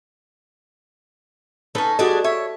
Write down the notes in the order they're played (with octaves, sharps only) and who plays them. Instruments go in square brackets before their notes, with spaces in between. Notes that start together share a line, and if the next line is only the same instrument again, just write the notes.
[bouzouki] C#4 D#4 [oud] A4 B4
[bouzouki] G3 D4 G#4 [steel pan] F#4 D#5 [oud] A4
[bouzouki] C#5 [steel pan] E5